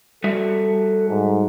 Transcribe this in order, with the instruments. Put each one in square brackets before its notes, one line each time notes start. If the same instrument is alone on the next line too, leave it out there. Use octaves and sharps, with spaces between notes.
[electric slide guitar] G3 F#4 E5 [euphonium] A4
[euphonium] G#2